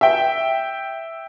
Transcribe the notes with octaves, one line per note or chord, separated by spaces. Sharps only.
E5 G5